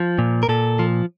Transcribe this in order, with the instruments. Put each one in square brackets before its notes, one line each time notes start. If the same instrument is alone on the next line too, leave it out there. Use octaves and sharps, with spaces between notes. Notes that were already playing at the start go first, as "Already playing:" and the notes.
Already playing: [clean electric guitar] F3
A#2
A#4
A#2 A4
F3